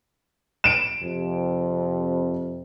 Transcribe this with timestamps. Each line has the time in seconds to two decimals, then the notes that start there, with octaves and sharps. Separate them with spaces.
0.64 D7 E7
1.02 F2 C3